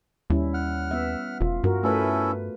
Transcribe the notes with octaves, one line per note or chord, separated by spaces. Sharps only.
D#2 G3 C#4 E4
F#5 F6
B3 E5
E1 F4
G2 F#4 A#4
A3 C#4 E4 A4 B4